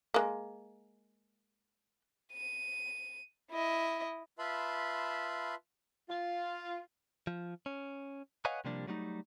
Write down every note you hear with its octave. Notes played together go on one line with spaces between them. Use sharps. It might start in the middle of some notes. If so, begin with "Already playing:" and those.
G#3 A#3
D#7
E4 D#5
F4 B4 E5 A5 B5 C6
F4
F3
C#4
B4 C#5 D#5 F5 F#5 G#5
C3 F3 G3 A#3 D4
F#3 G3 A3 C#4 D#4